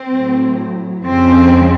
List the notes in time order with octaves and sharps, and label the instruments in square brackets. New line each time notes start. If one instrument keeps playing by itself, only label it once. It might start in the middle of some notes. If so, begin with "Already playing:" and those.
Already playing: [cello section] C4
A2 F#3
F2 C#3 F3 G#3 C4